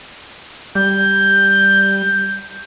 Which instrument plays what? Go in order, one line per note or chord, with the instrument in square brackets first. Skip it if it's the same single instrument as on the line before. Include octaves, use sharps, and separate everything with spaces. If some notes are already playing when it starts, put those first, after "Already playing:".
[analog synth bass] G3 [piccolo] G6